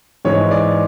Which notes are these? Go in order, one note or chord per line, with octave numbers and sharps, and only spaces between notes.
G#2 E3 G#3 C#5
D5